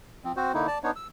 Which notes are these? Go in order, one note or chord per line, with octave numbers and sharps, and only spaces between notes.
F3 C4
C4 F#4 C5
D3 A#3 D#4 E4
D5 A5
B3 D4 D#4 C#5
E6